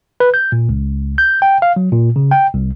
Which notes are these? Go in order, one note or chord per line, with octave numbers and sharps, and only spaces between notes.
B4
G6
A#2
C#2
G6
G5
F5
F#3
A#2
C#3
G5
C2